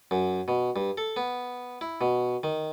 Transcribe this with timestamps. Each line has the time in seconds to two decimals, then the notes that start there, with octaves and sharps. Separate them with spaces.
0.11 F#2
0.48 B2
0.76 G2
0.98 A4
1.16 B3
1.81 E4
2.01 B2
2.43 D#3